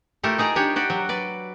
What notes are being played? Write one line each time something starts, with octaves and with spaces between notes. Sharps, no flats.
A3 E4 F4 G4 A4 A#4
D#4 G#4 D5 A#5
D4 D#4 G4 C#5
F#4 G4 D5
F#3
B4 D5